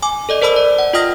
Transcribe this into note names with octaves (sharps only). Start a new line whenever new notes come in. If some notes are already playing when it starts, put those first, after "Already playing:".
G#5 D6
A4 D5 D#5
A#4 C5 A5 B5 E6
D5
F#5
F4 D#5 G5 D#6 F6 A#6